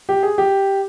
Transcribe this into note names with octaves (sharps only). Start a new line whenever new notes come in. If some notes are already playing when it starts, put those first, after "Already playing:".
G4
G#4
G4